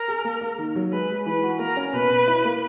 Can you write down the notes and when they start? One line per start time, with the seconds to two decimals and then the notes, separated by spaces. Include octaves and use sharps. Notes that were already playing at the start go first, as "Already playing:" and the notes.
Already playing: A#4
0.08 G#4
0.24 A#3
0.41 A#3
0.58 D#3
0.75 F#3
0.92 G#3 B4
1.10 G#3
1.26 E3 B4
1.43 F#4
1.59 A#3 A#4
1.77 C#4
1.93 B2 B4
2.10 B2
2.27 E4
2.45 A#3